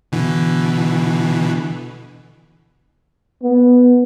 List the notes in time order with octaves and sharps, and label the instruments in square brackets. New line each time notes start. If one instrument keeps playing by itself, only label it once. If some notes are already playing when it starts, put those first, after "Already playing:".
[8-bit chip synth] B2 D3 E3
[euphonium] B3